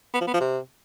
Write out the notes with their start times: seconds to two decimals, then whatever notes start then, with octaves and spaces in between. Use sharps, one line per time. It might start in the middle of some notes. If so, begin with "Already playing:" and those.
0.14 B3
0.21 F3
0.27 B3
0.34 F3
0.40 C3